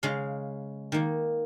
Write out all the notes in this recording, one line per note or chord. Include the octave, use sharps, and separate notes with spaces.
C#3 G#3 F5
D#3 A#3